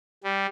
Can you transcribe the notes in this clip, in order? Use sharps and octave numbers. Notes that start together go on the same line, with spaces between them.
G3